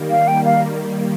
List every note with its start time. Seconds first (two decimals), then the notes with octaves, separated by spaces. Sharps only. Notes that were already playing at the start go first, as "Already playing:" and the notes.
Already playing: D#3 G3 A#3
0.11 F5
0.28 G5
0.45 F5